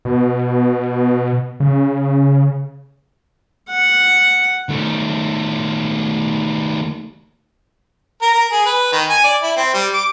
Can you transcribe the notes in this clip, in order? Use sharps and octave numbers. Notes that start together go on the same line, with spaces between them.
B2
C#3
F#5
D#3 A3
A#4
A#4
G#4
B4
D#3
G#5
D5
E4
C4
G3
D6